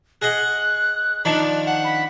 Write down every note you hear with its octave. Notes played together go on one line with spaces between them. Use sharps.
G#4 D#5 F#5 F#6
D#3 F3 D4 D5
F#5
B5